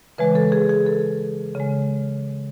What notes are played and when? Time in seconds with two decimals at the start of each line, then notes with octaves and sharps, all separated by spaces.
0.18 C#3 E3 G#3 B4
0.35 A4
0.52 G#4
0.69 G#4
0.87 A4
1.55 C#3 G#3